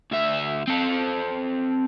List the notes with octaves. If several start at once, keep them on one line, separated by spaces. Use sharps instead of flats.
D2 E5
C4 A4